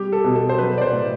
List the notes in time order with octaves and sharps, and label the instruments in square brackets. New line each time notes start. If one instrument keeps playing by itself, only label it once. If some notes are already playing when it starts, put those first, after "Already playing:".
Already playing: [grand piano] G3 G4
A4
B2
A4
C5
F#3 B4
D5
C5
A2